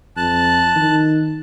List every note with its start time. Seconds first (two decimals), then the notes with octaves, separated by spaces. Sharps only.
0.17 F2 A5 F#6
0.75 D#3